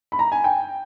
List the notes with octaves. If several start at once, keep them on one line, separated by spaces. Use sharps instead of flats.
B5
A#5
G#5
G5